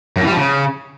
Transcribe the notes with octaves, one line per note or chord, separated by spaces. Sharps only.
F#2
E3
G3
F3
C#3